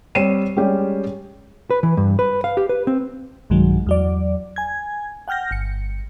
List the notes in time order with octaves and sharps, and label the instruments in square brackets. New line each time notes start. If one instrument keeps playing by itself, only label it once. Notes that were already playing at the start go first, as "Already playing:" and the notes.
[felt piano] G3 C4 C#5 C7 D#7 E7
G3 G#3 C#4 G4 D5
[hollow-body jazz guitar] B4
E3
G2
B4
F5
G4
B4
C4
[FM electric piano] B1 G2 D#3 F#3 G#3
E2 F#3 D5
G#5 G#6
F#5 G5 F6 G6 A#6
G1 C#7